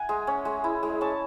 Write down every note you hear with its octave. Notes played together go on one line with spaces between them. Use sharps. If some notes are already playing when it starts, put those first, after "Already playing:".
Already playing: E5 F#5 G#5
G#3
C#4
G#3
E4
G#3
C#4 A5